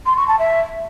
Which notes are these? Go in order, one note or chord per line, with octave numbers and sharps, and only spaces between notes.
C6
C#6
A5
E5